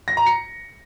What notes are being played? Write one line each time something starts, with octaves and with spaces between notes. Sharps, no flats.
A#6
A#5
C#7